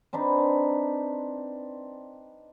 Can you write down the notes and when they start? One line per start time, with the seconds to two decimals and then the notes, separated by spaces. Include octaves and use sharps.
0.13 C4 D4 D#4 B4